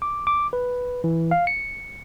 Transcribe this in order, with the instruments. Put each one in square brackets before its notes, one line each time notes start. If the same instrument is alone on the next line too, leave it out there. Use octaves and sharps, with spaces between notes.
[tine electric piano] D6
D6
B4
E3
F5
C#7